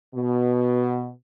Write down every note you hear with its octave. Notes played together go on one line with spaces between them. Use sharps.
B2